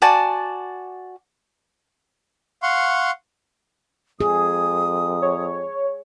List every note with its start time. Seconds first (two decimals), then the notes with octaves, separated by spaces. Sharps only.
0.02 F#4 D5 G#5 A5
2.63 F5 F#5 C6 C#6
4.21 F2 G#4 D#6
5.22 C#5